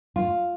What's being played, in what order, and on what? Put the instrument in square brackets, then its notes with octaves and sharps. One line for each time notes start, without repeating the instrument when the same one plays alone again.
[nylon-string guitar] F4